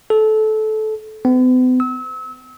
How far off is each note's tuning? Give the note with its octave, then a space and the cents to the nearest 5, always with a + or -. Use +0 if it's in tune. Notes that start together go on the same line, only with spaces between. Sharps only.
A4 -20
B3 +45
E6 -35